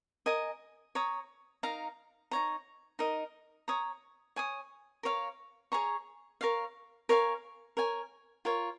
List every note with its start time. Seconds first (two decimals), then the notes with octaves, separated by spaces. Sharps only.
0.26 A#4 D#5 G#5 D#6
0.95 C#5 A#5 D#6
1.63 D#4 A#4 F5 A#5
2.31 D#4 C#5 A#5
2.99 D#4 A#4 D#5
3.68 C#5 A#5 D#6
4.36 C#5 G#5 D#6
5.03 A#4 C#5 F5
5.72 G#4 C#5 A#5 C#6
6.41 A#4 C#5 F5
7.09 A#4 C#5 F5 G#5
7.77 A#4 C#5 G#5
8.45 F4 A#4 C#5